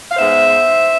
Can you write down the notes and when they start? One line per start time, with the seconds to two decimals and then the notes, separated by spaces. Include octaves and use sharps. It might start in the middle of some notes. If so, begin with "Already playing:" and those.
0.10 F5
0.16 G#2 G#3 B3 C5 E5